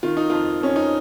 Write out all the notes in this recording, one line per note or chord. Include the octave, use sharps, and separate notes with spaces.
D#3 F4
D#4
F2 F4
F2 C#4
D#4